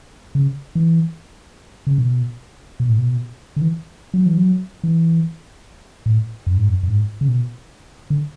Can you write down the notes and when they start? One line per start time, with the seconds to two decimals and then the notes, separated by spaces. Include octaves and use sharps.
0.35 C#3
0.75 E3
1.87 C#3
1.98 B2
2.80 B2
2.89 A2
2.98 B2
3.56 D3
3.61 E3
4.14 F#3
4.26 E3
4.38 F#3
4.84 E3
6.06 A2
6.47 F#2
6.57 G#2
6.68 F#2
6.83 F#2
6.88 G#2
7.21 C#3
7.28 B2
8.10 D3